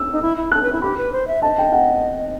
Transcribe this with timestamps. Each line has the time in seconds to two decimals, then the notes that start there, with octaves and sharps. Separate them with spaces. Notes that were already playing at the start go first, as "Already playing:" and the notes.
Already playing: E6
0.12 D#4
0.22 E4
0.37 E4
0.52 A4 F#6
0.62 B4
0.72 E4
0.82 G4 B5
0.97 B4
1.12 C5
1.28 E5
1.42 D#5 A5
1.58 G5
1.72 F#5